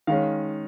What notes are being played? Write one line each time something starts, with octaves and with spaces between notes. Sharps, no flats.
D#3 G#3 C#4 F5